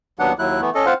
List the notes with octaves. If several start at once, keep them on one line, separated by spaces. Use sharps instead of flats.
D#2 F#3 B3 D4 F#5
D#2 F#3 E4 F#6
E3 A3 B3
C#4 A4 D#5
C4 F4 C5 F5 F#5